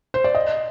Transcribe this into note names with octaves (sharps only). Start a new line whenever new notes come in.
C5
D5
D#5